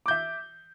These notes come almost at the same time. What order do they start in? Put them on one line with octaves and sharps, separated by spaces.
D6 G6 E5